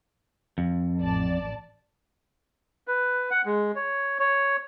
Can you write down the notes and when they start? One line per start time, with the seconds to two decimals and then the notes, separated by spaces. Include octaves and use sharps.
0.58 F2
1.00 A1 D5 A5
2.88 B4
3.31 F#5
3.46 G#3
3.76 C#5
4.19 C#5